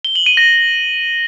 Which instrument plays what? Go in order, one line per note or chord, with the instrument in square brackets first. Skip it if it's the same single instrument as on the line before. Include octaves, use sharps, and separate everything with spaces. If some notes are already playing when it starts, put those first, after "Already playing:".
[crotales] G7
F#7
D#7
A#6